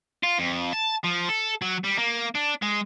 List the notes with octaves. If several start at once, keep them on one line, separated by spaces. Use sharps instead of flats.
F4
F2
A5
F3
A4
F#3
G3
A#3
D4
G#3